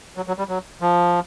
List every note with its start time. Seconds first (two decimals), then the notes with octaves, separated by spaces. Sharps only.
0.17 F#3
0.28 F#3
0.39 G3
0.49 F#3
0.81 F3